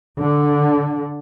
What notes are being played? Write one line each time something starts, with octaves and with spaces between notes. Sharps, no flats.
D3